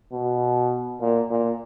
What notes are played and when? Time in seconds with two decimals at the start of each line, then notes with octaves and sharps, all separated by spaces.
0.13 B2
1.01 A#2
1.30 A#2